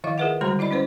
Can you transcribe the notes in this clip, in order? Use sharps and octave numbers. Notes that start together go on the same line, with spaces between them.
D#3 F3 E4 D#5 F5
F4 G#4 A#4 B4 E5 F#5
D3 G3 G#3 F#4 A#5 C6
E4 D5 D#5 B5
C#4 E4 B4 C5